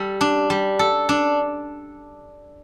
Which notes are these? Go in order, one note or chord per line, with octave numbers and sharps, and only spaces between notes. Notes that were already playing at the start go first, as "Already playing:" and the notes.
Already playing: G3 A4
D4
G3
A4
D4